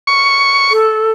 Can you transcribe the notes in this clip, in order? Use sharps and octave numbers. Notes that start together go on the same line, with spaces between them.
C#6
A4